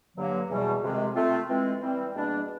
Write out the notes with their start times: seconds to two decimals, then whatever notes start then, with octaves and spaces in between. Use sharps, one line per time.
0.16 G2 D3 F#3 A#3
0.49 E2 B2 G3
0.82 F2 C3 D#3 G#3
1.15 A3 C4 F4
1.48 E3 G#3 C4
1.81 E3 G3 C4
2.14 E2 B2 G3 A#3 D4